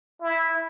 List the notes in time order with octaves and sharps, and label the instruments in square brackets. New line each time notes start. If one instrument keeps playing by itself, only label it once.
[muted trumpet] E4